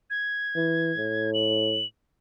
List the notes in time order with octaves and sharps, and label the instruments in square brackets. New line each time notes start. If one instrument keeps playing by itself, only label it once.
[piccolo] G#6
[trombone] E3
A2
[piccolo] F#7